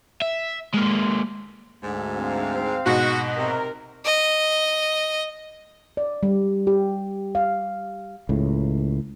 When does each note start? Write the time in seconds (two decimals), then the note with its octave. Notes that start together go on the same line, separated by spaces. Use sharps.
0.22 E5
0.74 G#3 A#3
1.83 D2 G#2
2.18 C4 F5
2.86 G#2 B2 F#4
3.37 C3 A#4
4.05 D#5
5.97 D5
6.23 G3
6.67 G4
7.35 F5
8.29 C#2 A2